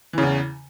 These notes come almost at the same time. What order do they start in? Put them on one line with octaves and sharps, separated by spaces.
E3 C#3 E2